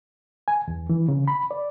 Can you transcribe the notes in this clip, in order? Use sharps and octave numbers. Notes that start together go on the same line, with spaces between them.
G#5
E2
E3
C#3
B5
D5